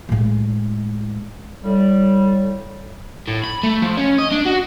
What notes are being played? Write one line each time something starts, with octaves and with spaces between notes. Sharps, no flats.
A2 G#3
A2 G3
A2
B5
A3
F3
C#4
D#5
D4
F#4